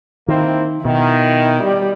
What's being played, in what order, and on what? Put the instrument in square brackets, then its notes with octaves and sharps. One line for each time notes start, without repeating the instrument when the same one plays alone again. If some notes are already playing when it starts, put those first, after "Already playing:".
[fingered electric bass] D#3 [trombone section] A#3 C4 E4
[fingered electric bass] B2 [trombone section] D#3 [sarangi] E4
[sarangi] G3